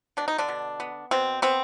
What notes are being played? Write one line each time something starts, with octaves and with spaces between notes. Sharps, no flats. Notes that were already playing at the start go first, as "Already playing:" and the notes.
B2 D4
D#4
D3 D4
B2
B3
B2 C4
B3 C4